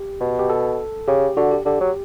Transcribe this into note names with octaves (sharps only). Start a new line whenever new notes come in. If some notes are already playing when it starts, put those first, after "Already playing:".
Already playing: G4
B2
G4
A4
C#3 G4
D3 F#4
G4
D3 G4
F#3